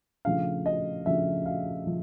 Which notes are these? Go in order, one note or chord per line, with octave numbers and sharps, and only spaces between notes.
C#3 F3 A3 D4 F5
D#5
C#3 F3 A3 D4 E5
F5
C#3 F3